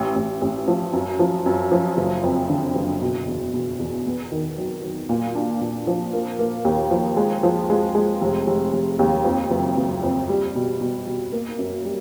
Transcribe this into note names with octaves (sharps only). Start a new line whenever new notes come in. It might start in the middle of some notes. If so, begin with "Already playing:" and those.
Already playing: A1
A1
A1
F3
F#2
F3
F#2
F3
F#1
F2
D3
F#1
B2
E2
B2
E2
B3
D#3
F#3
F#3
A#2
D4
A#2
F3
A#3
A#3
D#2
F3
G#3
F3
G#3
G#3
F1
F1
F1
D#2
F2
F#1
F#1
F2
G3
B2
B2
B2
A#3
F#2
G3